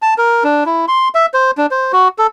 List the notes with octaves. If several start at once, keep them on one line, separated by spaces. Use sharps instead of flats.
A5
A#4
D4
E4
C6
E5
C5
D4
C5
F#4
A4